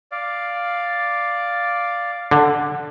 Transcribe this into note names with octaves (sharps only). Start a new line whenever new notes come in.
D5 F5
D3